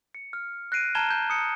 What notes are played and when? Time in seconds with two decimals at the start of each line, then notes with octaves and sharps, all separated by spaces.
0.15 C#7
0.33 F6
0.72 F#6 A#6 C7 D7 D#7
0.95 A5 A#5 F6 G#6 E7 G7
1.10 G6
1.30 D#6 C#7